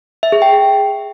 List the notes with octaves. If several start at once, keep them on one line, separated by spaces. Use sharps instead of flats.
E5
G#4
G5